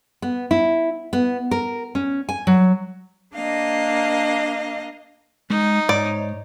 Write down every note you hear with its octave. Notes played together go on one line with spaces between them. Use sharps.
B3
E4
B3
A#4
C#4
G#5
F#3
A#3 D4 D#5 F5
G#3 D#4
G#2 C#5 D5